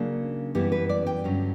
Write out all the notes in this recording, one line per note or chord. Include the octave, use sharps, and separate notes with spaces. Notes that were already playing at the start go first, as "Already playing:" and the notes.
Already playing: C#3 F#3 A#3 D4
F#2 E3 G3 B3 E4 G4
B4
D5
G5
G2 D3 F#3 C#4